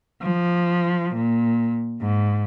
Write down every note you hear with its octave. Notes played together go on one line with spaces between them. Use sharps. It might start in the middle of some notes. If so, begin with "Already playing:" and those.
F3
A#2
G#2